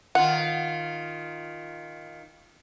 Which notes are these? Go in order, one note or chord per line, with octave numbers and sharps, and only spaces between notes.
D#3 F4 F#5